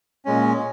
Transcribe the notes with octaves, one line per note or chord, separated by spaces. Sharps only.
A#2 G#3 C#4